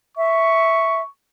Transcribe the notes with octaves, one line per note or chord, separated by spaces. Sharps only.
E5 C#6